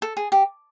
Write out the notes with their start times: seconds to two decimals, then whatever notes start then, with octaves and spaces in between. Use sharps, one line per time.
0.02 A4
0.17 G#4
0.32 G4